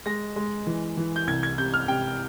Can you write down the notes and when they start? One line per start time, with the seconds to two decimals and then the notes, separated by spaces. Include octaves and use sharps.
0.06 G#3 A#6
0.36 G#3
0.67 E3
0.97 E3
1.16 G6
1.27 C2 G#6
1.43 G#6
1.58 C3 G6
1.74 F6
1.88 C3 G5